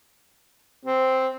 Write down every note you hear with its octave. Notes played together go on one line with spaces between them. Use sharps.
C4